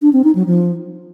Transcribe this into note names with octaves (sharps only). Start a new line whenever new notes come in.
D4
C4
D#4
F#3
F3